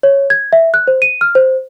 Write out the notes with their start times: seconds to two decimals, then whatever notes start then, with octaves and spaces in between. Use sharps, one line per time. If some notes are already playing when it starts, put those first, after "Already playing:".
0.03 C#5
0.30 G#6
0.53 E5
0.74 F#6
0.87 C5
1.02 D#7
1.21 F6
1.35 C5